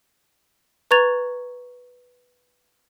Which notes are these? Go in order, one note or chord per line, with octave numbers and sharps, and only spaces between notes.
B4 A#5 C#6 G#6 A6 F7